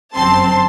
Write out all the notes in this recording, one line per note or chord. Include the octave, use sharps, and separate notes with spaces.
G1 F#2 F#3 C4 A5 C6